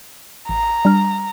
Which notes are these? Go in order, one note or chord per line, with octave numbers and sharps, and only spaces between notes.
A1 A#5 C7
G3 D4 F6